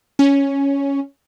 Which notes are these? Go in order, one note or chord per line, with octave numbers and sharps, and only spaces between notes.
C#4